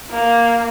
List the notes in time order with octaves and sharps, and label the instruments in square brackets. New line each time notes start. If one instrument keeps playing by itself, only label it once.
[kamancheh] A#3